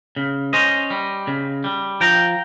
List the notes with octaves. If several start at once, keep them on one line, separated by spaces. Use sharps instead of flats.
C#3
C#4 C5 D#5
G3
C#3
G3
F3 G5 A#5